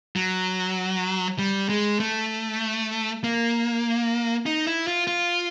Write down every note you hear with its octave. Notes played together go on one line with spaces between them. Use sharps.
F#3
G3
G#3
A3
A#3
D#4
E4
F4
F4